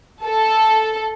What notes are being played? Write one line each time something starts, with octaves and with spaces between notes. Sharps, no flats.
A4